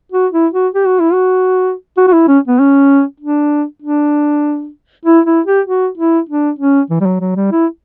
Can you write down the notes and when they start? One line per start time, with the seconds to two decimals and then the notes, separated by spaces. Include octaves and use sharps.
0.12 F#4
0.33 E4
0.54 F#4
0.75 G4
0.86 F#4
1.00 E4
1.13 F#4
1.97 F#4
2.07 F#4
2.13 E4
2.28 C#4
2.48 B3
2.59 C#4
3.20 D4
3.82 D4
5.05 E4
5.26 E4
5.46 G4
5.67 F#4
5.98 E4
6.29 D4
6.59 C#4
6.90 E3
7.01 G3
7.06 F#3
7.20 F#3
7.36 G3
7.52 E4